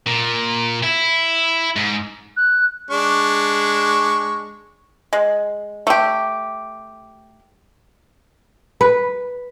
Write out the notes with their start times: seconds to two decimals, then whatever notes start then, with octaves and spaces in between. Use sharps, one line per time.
0.07 A#2
0.83 E4
1.76 G#2
2.37 F#6
2.90 G#3 D4 C#6
5.13 G#3
5.87 A3 G4
8.81 B4